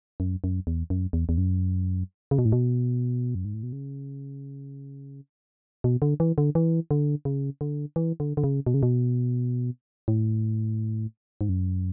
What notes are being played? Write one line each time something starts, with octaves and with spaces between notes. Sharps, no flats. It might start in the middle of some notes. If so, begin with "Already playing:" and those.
F#2
F#2
E2
F#2
E2
E2
F#2
C#3
B2
A2
B2
F#2
G#2
A2
B2
C#3
B2
D3
E3
D3
E3
D3
C#3
D3
E3
D3
D3
C#3
B2
C#3
B2
A2
G#2
F#2